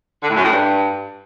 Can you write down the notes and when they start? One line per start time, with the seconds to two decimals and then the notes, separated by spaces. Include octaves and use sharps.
0.22 D3
0.29 A2
0.36 F#2
0.43 A2
0.49 G2